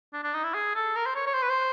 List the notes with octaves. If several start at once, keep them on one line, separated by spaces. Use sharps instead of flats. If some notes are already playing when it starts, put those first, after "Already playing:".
D4
D4
D#4
E4
G#4
A4
A#4
C5
C#5
C#5
C5
B4
C5